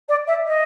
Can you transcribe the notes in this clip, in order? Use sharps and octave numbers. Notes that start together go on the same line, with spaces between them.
D5
E5
D#5